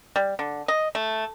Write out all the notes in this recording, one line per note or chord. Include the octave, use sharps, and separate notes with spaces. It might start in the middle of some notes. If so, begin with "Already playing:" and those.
G3
D3
D#5
A3